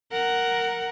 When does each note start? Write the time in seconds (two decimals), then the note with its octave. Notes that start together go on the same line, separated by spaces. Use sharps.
0.12 A#4 F#5